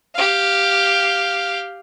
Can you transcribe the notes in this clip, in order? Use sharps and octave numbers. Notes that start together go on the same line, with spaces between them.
G4 F5